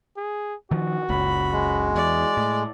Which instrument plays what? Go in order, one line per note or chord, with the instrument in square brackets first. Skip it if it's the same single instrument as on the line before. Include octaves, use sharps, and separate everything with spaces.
[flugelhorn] G#4
[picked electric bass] D#3 F3 [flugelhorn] F#4
[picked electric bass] F#1 C#2 [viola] B5
[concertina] G#3
[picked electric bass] E2 [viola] D5
[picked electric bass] A2